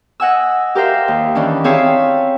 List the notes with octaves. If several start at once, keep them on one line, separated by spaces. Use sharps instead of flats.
D#5 F#5 G#5 E6
G4 A#4 C5 E5 F5
D#2
D#3 E3 C#4 D4
C4 G#4 C#5 E5 F5 A5